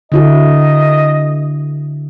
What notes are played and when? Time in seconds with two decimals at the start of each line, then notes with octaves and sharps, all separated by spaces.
0.12 D3 E4 F#4 D#5